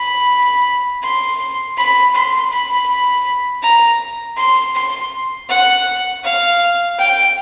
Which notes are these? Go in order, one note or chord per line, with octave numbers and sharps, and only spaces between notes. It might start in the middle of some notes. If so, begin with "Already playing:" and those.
Already playing: B5
C6
B5
C6
B5
A#5
C6
C6
F#5
F5
G5